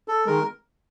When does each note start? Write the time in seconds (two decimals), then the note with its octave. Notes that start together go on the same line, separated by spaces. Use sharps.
0.08 A4
0.26 D#3 G#3 A#4